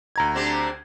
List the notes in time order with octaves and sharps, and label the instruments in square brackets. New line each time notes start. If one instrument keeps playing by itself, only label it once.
[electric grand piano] D2 A#5 G#6
[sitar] C4 D4 G4